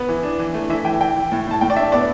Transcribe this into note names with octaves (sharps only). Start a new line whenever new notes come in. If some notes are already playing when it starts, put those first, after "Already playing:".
Already playing: B3 B4
E3
D4
E3
A3
E3 E5
E3 G5
E3 G5
E3
A2
A2 A5
A2 G5
D5
D4 E5
B3 D5